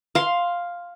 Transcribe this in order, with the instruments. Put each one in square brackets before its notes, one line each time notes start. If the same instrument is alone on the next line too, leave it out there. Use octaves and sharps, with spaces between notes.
[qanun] F5 C6